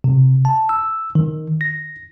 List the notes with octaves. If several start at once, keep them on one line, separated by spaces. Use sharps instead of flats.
C3
A5
E6
D#3
A#6